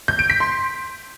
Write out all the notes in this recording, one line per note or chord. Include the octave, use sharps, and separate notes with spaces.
G6
D7
B6
C6